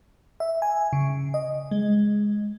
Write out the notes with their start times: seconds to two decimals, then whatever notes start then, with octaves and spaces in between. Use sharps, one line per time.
0.40 E5
0.62 G#5
0.93 C#3
1.34 D#5
1.71 G#3